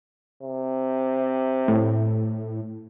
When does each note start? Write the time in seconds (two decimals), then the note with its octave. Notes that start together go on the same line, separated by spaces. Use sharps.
0.43 C3
1.68 A2